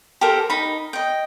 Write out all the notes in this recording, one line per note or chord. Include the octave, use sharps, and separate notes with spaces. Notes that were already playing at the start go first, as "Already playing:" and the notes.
G4 A4 A#4 C5
D#4 B5
D#5 G5